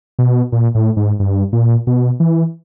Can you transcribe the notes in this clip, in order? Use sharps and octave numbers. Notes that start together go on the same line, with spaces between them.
B2
A#2
A2
G#2
G2
A#2
B2
E3